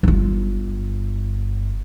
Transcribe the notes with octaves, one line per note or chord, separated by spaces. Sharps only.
G1 F4